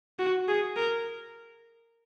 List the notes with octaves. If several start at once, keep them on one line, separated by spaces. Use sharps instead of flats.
F#4
G#4
A#4